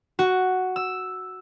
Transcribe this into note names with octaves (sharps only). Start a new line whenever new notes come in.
F#4
E6